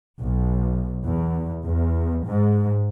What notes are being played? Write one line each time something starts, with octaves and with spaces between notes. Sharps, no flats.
B1
E2
E2
G#2